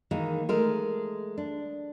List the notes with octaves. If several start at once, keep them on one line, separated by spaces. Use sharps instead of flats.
D#3 E3 G#3 A#3
G#3 A3 A#4
D4